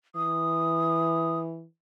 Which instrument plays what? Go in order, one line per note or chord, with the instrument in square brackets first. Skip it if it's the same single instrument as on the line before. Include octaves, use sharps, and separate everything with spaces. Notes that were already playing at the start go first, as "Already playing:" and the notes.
[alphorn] E3 [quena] D#6